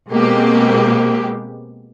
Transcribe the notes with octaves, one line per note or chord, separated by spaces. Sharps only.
B2 G#3 A#3 C4 G4